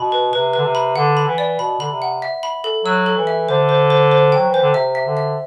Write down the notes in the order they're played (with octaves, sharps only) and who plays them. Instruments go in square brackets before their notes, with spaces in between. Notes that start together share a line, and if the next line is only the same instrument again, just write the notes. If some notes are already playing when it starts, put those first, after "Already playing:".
Already playing: [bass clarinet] B2 [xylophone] B5
[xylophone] B4
[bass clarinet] C3 [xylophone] B4
[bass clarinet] D3 [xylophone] B4
[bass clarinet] C3
[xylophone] B5
[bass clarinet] D3 [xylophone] F#5
[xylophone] B5
[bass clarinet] E3
[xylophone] D5
[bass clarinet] B2 [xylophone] B5
[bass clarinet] D3 [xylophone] B5
[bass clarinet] C3
[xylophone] F#5
E5
B5
A4
[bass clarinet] F#3 [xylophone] E6
[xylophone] A4
[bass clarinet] E3
[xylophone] E5
[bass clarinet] D3 [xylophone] C5
[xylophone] C5
C5
C5
G5
[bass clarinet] F#3
[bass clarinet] E3 [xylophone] C5
[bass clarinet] D3
[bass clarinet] C3 [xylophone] E5
[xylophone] E5
[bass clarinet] D3
[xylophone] E5